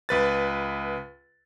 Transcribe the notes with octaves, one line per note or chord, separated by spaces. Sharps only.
C#2 B4 A6